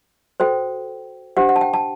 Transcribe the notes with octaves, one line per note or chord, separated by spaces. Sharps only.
F#4 A4 C5 G5
D4 G4 C5 F#5
F#5
A5
G5
A5